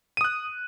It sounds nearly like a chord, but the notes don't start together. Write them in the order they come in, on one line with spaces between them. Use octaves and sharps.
D#7 D#6 F#6